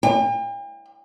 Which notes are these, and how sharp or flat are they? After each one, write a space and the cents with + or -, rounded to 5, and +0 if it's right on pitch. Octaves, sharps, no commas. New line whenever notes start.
G5 +45